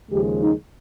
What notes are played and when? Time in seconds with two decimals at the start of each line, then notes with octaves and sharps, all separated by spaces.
0.11 D#2 C#3 F3 G#3 G4
0.41 D#4